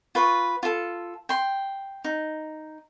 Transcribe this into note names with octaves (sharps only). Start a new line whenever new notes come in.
F4 B4 C#6
F4 A4
G5 C6
D#4